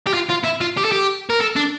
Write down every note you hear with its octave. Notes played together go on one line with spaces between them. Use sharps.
G4
F4
F4
E4
F4
G4
A4
G4
A#4
A4
D4